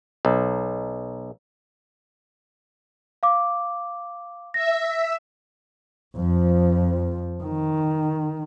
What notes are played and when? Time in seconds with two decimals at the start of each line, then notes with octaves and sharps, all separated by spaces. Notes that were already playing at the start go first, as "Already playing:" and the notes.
0.25 B1
3.23 F5 D6
4.54 E5 A#6
6.15 F2 F3
7.43 D#3